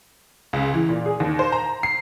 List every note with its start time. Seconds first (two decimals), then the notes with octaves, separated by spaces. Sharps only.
0.53 C#2
0.74 E3
0.89 A#2
1.06 G#4
1.20 D#2
1.39 C5
1.52 A#5
1.83 C7